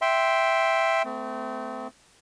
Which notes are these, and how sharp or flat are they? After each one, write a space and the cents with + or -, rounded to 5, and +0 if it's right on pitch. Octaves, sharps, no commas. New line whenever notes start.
E5 +0 G5 +0 C6 +0
A3 +0 C4 -35